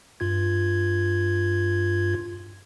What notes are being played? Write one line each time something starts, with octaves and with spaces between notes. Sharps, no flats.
G2 F4 G#6